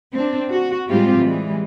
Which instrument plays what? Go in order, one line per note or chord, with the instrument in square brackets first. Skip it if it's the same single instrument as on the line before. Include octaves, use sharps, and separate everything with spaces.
[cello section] C4 D4
F#4
A2 G3 G#3 C4 F4 G4
E3 G3 G#3